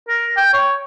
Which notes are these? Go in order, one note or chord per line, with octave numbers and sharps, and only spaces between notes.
A#4
G5
C#5